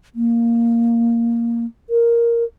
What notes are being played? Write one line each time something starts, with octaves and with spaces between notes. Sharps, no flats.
A#3
A#4